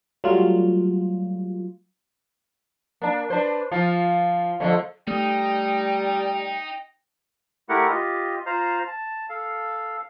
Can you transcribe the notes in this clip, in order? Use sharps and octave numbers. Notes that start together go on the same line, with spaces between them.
F#3 G3 A3 F4
A#3 D4
D4 B4 C5
F3 F4
F2 D3 A3
G3 A3 D#4 G5 D#6
A3 E4 G4 A#4 F#5
F4 G4 D#5
F4 C5 F5 A#5
A5
A4 F5